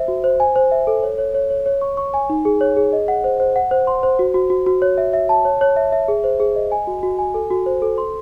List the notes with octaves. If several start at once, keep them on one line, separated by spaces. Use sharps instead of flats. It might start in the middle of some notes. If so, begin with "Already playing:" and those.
Already playing: C5 E5
F#4
C5
G#5
C5
E5
A4
C#5
C#5
C#5
C#5
C#5
C#6
C#6
G#5
D#4
G#4
C#5
G#4
D#5
F#5
C5
C5
F#5
C5
C6
C5
F#4
F#4
F#4
F#4
C#5
E5
E5
A5
C#5
C#5
E5
E5
G#4
C5
G#4
D#5
G#5
F#4
F#4
G#5
A4
F#4
C5
A4
C6